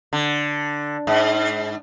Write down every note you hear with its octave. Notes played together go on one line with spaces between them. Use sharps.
D3
G#2